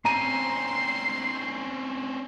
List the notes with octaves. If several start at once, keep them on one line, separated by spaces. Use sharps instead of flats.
C4 C#4 A#5 C6 D#7